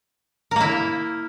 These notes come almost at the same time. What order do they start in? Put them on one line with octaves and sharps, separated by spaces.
A#4 A#3 E4